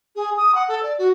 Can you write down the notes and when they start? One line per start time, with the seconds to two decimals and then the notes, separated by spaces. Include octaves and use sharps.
0.15 G#4
0.37 D#6
0.54 F#5
0.68 A4
0.82 D5
0.98 F#4